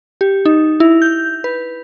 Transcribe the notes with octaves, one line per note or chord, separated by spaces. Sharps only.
G4
D#4
E4
G6
B4